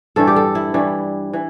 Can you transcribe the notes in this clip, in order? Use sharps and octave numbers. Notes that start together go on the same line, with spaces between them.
G2 E3 G3 A4
G4
A4
E4
G2 E3 G3
E3